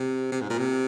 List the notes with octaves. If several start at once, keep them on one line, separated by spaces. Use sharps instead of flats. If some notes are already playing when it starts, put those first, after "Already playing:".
Already playing: C3
C3
G#2
A#2
C3